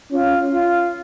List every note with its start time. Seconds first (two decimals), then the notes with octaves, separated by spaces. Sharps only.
0.11 C#4 F4
0.50 F4